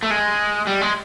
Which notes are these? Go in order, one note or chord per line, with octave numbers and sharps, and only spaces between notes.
A3
G#3
G3
G#3